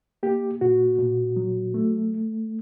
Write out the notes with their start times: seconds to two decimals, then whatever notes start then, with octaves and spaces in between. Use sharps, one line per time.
0.23 A#3 G4
0.61 A#2 F#4
0.99 A#2
1.36 F#3
1.74 A3